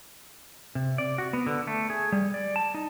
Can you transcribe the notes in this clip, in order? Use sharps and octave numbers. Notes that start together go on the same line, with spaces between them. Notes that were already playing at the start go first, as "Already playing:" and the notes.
C3
D5
F#4
B3
D3
A3
G#4
G3
D5
A5
D#4